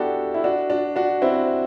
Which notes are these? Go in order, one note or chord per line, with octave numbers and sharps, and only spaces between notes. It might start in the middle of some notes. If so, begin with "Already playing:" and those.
Already playing: B3 D4 E4 F#4 G4 A4
E4
D4 F#4
D4 F#4
D4 F#4
C4 E4